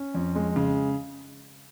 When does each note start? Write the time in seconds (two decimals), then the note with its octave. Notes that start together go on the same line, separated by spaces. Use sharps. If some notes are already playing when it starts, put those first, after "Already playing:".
Already playing: C#4
0.15 F2
0.35 G#3
0.56 C#3